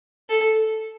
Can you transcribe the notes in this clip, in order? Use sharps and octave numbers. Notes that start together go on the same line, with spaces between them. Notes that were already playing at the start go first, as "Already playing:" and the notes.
A4